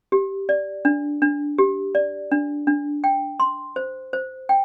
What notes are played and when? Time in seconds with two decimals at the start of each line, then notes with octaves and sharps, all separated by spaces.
0.12 G4
0.49 D5
0.85 D4
1.22 D4
1.58 G4
1.95 D5
2.32 D4
2.67 D4
3.04 G5
3.40 C6
3.76 C5
4.13 C5
4.49 G5